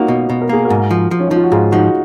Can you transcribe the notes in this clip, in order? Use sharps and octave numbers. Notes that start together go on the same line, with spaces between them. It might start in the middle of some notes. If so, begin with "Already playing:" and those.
Already playing: A#3 C#4 D#4 F4 F#4
B2
B2
A#4
A#3 G#4
F#4 A#4
G#2
F3
F3
C#4
D#4
F3
F4
F#4
G#2 F4 G#4
F3 D#4 F#4